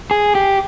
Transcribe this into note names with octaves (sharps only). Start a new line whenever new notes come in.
G#4
G4